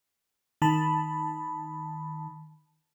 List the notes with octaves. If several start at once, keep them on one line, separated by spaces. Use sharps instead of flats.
D#3 A5 B5